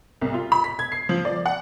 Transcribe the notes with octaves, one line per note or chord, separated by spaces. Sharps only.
C2
F4
B5
B6
G#6
C7
F3
D5
F#5